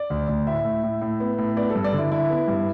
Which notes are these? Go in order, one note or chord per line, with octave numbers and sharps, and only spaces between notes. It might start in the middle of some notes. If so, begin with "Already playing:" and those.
Already playing: D5
D2
D2
A2 E5
A2
A2
A2
B3
A2
B3 D5
A4
G2
D5
D3
E4
D3 E4
B3
G2